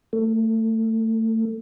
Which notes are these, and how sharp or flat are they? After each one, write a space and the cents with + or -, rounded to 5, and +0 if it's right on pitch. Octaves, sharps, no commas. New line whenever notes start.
A3 +25